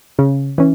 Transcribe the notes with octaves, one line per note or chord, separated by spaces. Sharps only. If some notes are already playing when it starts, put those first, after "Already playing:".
C#3
E3 C#4